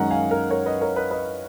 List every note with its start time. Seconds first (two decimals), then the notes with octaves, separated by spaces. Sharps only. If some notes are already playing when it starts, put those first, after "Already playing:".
Already playing: F#2 D#3 G#3 C#4 F#5 A#5
0.11 F5 G#5
0.31 A#4
0.50 A#4 C#5
0.66 B4 D#5
0.81 A#4 C#5
0.96 B4 D#5
1.11 B4 D#5